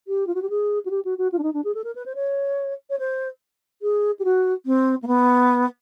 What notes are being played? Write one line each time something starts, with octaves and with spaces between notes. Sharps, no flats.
G4
F4
F#4
G4
G#4
F#4
G4
F#4
F#4
F4
D4
D#4
D4
G#4
A4
A#4
B4
C5
C#5
C#5
C5
G#4
G4
F#4
C4
A#3
B3